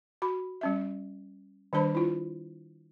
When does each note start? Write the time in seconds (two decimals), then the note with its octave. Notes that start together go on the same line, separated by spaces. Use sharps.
0.22 F#4 B5
0.61 G3 C#4 E5
1.73 D#3 G3 D4 C5 B5
1.95 E4 F4